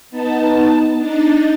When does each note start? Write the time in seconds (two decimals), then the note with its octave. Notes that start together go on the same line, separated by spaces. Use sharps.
0.11 B3 D#4 A5
0.98 D4 D#4 A6